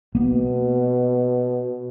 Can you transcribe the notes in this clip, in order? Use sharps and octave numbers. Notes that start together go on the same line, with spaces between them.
B2 A#3 B3